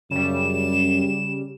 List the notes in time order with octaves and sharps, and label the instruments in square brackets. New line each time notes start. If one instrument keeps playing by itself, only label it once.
[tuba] F#2 [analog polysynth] C#3 G3 [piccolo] E7